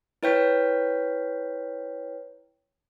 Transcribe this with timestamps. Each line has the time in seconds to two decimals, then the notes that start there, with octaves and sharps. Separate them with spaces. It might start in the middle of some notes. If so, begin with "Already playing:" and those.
0.23 E4 B4 C#5 G5 G6 B6